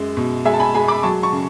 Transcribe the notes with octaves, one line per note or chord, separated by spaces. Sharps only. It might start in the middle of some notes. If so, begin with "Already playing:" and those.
Already playing: F#2 G#3
B2
G#3 E5 G#5
A5
G#5 B5
G#3 G#5 B5
B5 D6
F#3 A5 C#6
A5 C#6
C#3